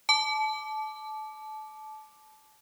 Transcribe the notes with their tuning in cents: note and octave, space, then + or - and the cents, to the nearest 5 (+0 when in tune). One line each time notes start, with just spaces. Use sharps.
A5 -25 D6 +5